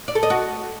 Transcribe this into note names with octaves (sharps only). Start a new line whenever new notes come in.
D5
A4
D#5
F#4